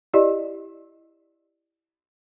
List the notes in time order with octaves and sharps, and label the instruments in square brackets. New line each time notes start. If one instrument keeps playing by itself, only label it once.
[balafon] E4 G4 D5 D#5